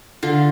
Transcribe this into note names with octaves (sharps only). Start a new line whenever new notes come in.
D3 F4